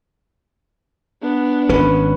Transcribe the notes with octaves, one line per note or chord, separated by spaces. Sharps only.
B3 D4
G#1 C#4 B4